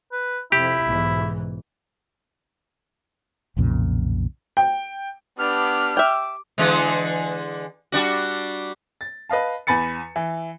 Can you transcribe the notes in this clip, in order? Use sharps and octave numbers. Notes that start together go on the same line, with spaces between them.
B4
F2 C3 E4 G4
B1 G#2 E3
B1 F2 A#2 C#3
G5
B3 D4 G4 F6
E5 G5 D6
D3 E3 G#3
G3 D4 F#4
A6
B4 D#5 F5 A5
E2 G#5 B5 A6 C#7
E3